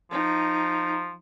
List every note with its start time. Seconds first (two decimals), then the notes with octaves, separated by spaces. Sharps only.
0.11 F3 D#4